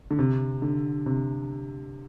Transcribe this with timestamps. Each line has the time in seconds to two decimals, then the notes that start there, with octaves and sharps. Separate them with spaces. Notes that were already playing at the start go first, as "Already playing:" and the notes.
0.11 D3
0.19 C3
0.62 D3
1.06 C3